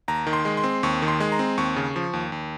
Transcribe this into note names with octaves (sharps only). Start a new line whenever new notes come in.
D#2 A#5
D#3
C6
G#3
C6
C4
D#2 C#6
D#3
C6
G#3
A#5
C4
D#2 C#6
C#3
F3
D#2
D#2